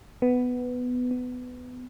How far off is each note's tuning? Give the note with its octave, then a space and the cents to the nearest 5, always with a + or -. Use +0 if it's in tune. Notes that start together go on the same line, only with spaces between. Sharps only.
B3 +10
B3 +20